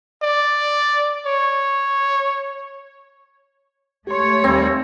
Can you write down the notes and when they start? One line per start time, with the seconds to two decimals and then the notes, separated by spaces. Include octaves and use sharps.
0.22 D5
1.26 C#5
4.07 A3 G4 C#5 C6
4.44 D#2 G3 C4